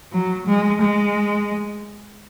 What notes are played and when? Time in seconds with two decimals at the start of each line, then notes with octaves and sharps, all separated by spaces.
0.12 F#3
0.46 G#3
0.81 G#3